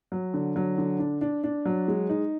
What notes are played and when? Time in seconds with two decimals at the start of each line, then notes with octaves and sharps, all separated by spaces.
0.12 F#3
0.34 D3
0.56 F#3
0.78 D3
0.99 D4
1.21 D4
1.44 D4
1.65 F#3
1.88 G#3
2.09 D#4